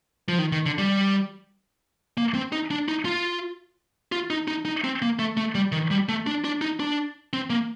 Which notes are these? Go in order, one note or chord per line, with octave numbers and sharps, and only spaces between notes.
F3
D#3
D#3
D3
G3
A#3
C4
D#4
D4
D#4
F4
F4
D#4
D#4
D#4
C4
A#3
A3
A3
G3
D#3
G3
A3
D4
D4
D#4
D4
C4
A#3